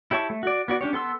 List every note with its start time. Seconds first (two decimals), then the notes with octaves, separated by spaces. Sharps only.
0.11 E4 G4 C#5 A5 C#6
0.30 A3
0.43 F#4 D5
0.68 B3 F#4 D5
0.81 C#4 D4 G4 C#5
0.93 B3 A4 C6 E6